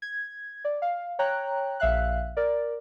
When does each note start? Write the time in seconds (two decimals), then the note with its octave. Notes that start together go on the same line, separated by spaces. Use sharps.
0.02 G#6
0.65 D5
0.82 F5
1.19 C#5 G5 A#5 F#6
1.80 A#1 E5 F5 F#6
2.37 A#4 D5